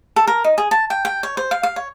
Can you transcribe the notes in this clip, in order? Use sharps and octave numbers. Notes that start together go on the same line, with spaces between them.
A4
A#4
D#4
G#4
A5
G5
G5
C#5
C5
F5
F5
C#5